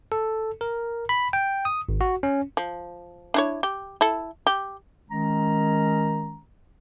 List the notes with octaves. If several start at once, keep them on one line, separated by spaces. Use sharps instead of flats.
A4
A#4
B5
G5
D#6
G#1
F#4
C#4
F3
D4 E4 C#5
G4
E4 A4
G4
D#3 G#3 C#4 A#5